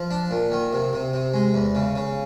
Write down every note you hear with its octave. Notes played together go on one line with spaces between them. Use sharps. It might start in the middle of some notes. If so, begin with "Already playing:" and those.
Already playing: F3
D4
A#2
D#3
C3
C3
C3
G#3
E2
C#3
C#3